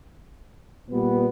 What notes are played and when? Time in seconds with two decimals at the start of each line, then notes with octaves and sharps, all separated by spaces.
0.90 A#2 G3 B3